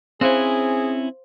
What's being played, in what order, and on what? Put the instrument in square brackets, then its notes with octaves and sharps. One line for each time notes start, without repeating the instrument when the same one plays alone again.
[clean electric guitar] C4 C#4 E4 [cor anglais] G#4 [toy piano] C5 F5 C6